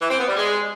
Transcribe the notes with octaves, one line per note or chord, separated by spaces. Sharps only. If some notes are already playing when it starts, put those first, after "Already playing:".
E3
C4
B3
G3
G#3